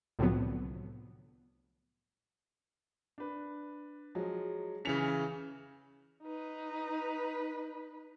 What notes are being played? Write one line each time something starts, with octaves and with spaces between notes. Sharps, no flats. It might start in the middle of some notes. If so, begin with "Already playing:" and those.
C2 A2 D3 F3 F#3 B3
D4 B4
F3 F#3 G#3
C#3 E3 C#4 B6 C#7 F7
D#4 B4